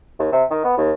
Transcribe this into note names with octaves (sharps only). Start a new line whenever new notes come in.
D#2
C3
D#3
B3
D#2